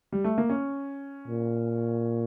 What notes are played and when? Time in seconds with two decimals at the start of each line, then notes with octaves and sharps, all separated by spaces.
0.12 G3
0.24 A3
0.38 A#3
0.50 C#4
1.27 A#2